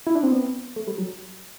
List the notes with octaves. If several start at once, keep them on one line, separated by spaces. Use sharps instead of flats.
E4
D4
C4
B3
A3
G3
F#3